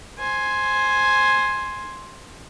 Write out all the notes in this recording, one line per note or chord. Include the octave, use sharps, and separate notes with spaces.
C5 G#5